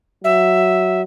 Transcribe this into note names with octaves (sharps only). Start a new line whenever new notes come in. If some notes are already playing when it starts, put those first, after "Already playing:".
F#3 E5